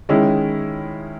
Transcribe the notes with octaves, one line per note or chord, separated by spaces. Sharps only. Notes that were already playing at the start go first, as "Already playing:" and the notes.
D#3 G#3 C#4 E4